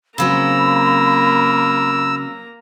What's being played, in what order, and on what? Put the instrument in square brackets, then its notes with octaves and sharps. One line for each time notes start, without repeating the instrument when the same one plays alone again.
[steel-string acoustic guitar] C#3 F#3 C4 [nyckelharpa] A#3 A#5 [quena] B5 [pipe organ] E6